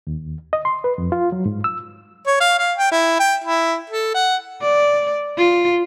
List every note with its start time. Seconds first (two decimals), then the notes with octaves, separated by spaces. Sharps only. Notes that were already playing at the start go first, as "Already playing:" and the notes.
0.07 D#2
0.53 D#5
0.65 C6
0.84 B4
0.98 F2
1.12 F4
1.32 F#3
1.46 G#2
1.64 E6
2.27 C#5
2.40 F5
2.59 F5
2.78 G5
2.92 E4
3.20 G5
3.44 E4
3.90 A4
4.15 F#5
4.61 D5
5.37 F4